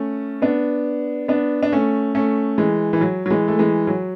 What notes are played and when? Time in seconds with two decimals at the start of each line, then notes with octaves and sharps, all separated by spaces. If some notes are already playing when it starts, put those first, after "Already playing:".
Already playing: A3 C#4
0.42 B3 D4
1.28 B3 D4
1.63 D4
1.72 A3 C#4
2.15 A3 C#4
2.58 E3 G#3
2.93 E3
3.01 F#3
3.26 F#3
3.30 E3 G#3
3.48 A3
3.59 E3 G#3
3.87 F#3